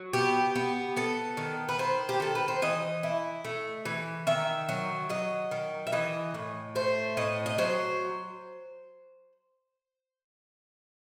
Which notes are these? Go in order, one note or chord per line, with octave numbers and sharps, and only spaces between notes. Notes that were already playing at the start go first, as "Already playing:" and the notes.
Already playing: F#3
B3 G4
B3
B3 A4
D#3
B4
D#3 C5
G4
D#3 A4
B4
C5
E3 D#5
E4
A3
E3
D#3 E5
F#3
F#3 D#5
D#3
E5
E3 D#5
A2
A3 C5
A2 D#5
D#5
F#3 C5